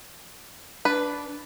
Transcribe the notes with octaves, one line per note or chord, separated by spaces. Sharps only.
D4 B4